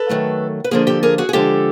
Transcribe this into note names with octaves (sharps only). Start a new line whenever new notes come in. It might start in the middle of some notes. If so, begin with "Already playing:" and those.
Already playing: A4 B4
D#3 F#3 A3
B4
D3 F3 A#3 G#4 A#4
G4 A4
G#4 A#4
F#4 G#4
G#4
D3 F3 G#3 G4 A4